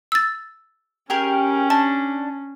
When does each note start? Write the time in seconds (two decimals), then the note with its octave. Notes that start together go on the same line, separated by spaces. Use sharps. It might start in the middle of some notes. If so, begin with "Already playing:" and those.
0.12 E6 A6
1.10 C#4 G4 G#4 A#4
1.70 D4 A5